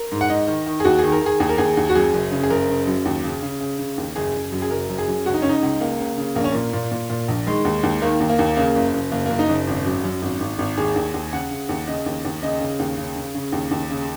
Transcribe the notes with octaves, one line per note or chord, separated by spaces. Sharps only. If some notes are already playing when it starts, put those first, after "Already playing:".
Already playing: A#4
G#2
F#5
G#2 D#5
D#3
D#3
G#4
D#2 F#4
D#3 G#4
A#4
D#3 G#4
D#2 G#4
A#4
D#2 G#4
D#2
F#4
F#2 G#4
F#1
C#3
G#4
F#1 A#4
C#3
F#2
D#2
C#3
C#3
C#3
C#3
D#2
F#1 G#4
F#1
F#2
G#4
F#1 A#4
F#2
G#4
F#2
C#2 F#4
D#4
C#3 C#4
D#4
C#2
C#2 A#3
C#3
C#3
A#1 A#3
C#4
A#2 A#3
A#2
A#2
A#2
A#1
D#3 G#3
D#2
D#2
D#3 A#3
D#2
A#3
D#2
C#3 A#3
F#1
F#1
F#1 A#3
F#1 A#3
D#4
F#1
G#1
F#2
F#2
G#1
G#1
G#1
D#2 G#4
D#2
D#2
C#3 F#5
C#3
D#2
C#3 D#5
D#2
D#2
C#3 D#5
C#3
D#2
C#3
C#3
C#3
D#2
D#2
C#3